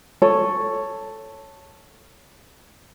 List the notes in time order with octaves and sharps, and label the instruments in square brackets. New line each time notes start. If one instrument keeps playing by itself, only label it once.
[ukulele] A4 C#5